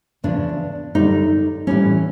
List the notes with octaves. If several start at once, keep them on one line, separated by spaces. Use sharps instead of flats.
E2 C#3 F3 D4
F#2 D3 G3 D#4
A2 E3 G3 C#4